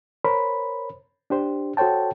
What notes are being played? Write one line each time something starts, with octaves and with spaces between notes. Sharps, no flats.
A#4 C5 C#5 B5
D4 G4 C5
F#4 A4 C5 C#5 G5 A5